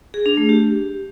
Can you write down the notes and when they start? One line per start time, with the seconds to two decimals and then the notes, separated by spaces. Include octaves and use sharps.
0.14 G#4
0.26 D4
0.37 A3
0.49 G4